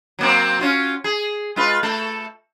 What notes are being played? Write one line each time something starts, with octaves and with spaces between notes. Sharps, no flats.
F#3 A#3 C4
C#4 F4 F#4
G#4
G#3 F4 B4
A3 A4